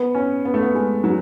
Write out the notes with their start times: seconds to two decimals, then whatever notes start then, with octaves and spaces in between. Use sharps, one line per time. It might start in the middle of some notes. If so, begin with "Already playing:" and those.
Already playing: B3
0.15 C#4
0.45 B3
0.54 A3
0.62 B3
0.75 G#3
1.04 F#3